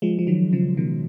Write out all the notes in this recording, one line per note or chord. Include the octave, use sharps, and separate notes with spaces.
F3 G#3
F3
D#3 F#3
C#3 F3
B2 D#3